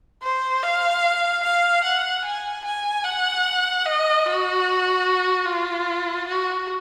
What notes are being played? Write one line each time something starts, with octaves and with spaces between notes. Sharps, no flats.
C5
F5
F5
F#5
G#5
G#5
F#5
D#5
F#4
F4
F#4